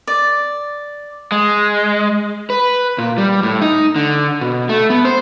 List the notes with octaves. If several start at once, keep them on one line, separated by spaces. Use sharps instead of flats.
D5
G#3
B4
A#2
G3
A2
D#4
D3
B2
A3
B3
C5